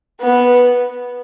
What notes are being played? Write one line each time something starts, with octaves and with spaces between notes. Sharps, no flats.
B3